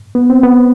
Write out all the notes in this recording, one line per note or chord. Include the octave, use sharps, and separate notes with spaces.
B3
C4
B3